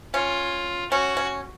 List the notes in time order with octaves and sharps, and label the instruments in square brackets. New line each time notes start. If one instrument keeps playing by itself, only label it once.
[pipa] C#4 [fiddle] F4
[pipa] C#4 [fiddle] F#4
[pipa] C#4